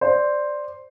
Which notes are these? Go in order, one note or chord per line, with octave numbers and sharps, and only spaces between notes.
C5 D5